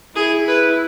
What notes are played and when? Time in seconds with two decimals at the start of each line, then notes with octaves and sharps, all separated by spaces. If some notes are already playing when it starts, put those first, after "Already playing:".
0.16 E4 G#4
0.48 B4